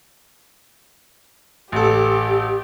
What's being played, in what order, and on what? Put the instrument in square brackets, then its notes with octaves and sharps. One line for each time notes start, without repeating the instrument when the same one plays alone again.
[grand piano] A1 A4 [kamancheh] G4